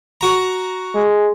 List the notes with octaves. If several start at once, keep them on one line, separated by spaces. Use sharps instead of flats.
F#4 A#5
G#3